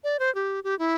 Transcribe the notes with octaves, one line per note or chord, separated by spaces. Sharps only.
D5
C5
G4
G4
E4